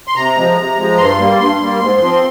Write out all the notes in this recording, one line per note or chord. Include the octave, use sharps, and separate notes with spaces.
C6
C3 A#5
F3 G#3
C3
F3 G#3
G2 C6
G3 A#3
G2 C6
G3 A#3
G#2
F3 C4